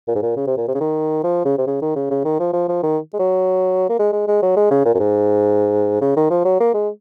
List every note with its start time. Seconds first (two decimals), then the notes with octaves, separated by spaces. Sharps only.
0.08 A#2
0.15 G#2
0.22 A#2
0.37 C#3
0.47 C3
0.57 A#2
0.68 C3
0.75 C#3
0.81 D#3
1.24 F3
1.45 C#3
1.58 C3
1.67 C#3
1.82 D#3
1.96 C#3
2.11 C#3
2.25 D#3
2.40 F3
2.54 F3
2.69 F3
2.83 D#3
3.14 G#3
3.19 F#3
3.89 A#3
3.99 G#3
4.13 G#3
4.28 G#3
4.43 F#3
4.57 G#3
4.71 C#3
4.85 A#2
4.94 F#2
5.00 G#2
6.02 C#3
6.17 D#3
6.31 F3
6.45 F#3
6.60 A#3
6.74 G#3